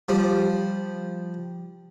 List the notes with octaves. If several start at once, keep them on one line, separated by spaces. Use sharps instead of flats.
F3 G3